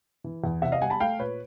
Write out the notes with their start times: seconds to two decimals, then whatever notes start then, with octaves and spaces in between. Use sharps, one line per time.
0.24 E3
0.44 E2
0.62 C3 E5 F#5
0.72 D#5 F5
0.81 G3 F#5 G#5
0.90 A5 B5
1.00 A3 F5 G5
1.19 A#2 B4 C#5